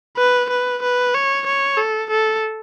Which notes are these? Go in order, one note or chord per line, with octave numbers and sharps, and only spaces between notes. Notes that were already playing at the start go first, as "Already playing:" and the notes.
B4
B4
B4
C#5
C#5
A4
A4